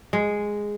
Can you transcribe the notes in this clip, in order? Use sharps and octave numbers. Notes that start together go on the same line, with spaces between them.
G#3